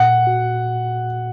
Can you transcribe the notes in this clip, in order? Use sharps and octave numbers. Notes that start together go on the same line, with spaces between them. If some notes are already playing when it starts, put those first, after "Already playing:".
Already playing: A#2 F#5
F#4